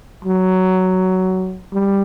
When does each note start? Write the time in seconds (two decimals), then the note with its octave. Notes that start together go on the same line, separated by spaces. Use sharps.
0.25 F#3
1.74 G3